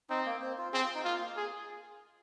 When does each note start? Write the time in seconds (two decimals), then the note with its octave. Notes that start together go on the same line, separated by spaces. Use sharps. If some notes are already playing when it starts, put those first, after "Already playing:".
0.09 C4 D#4
0.26 A#3
0.41 C4
0.58 F4
0.73 C4 G#4
0.84 F4
0.94 D#4
1.04 A#3 F4
1.21 A#3
1.37 G#4